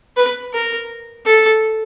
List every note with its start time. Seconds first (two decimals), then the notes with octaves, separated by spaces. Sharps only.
0.16 B4
0.53 A#4
1.25 A4